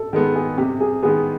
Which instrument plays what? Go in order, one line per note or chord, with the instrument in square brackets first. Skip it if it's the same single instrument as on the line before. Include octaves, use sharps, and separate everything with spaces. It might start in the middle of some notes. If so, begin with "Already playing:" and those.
Already playing: [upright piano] A4
[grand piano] D#3 G#3 B3 [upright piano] A4
[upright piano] G#4
[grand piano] C3 [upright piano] G4
[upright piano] G#4
[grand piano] D#3 G#3 B3 [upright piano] G#4